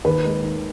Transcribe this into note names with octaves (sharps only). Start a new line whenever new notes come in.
D#2 B4
G#3
D#4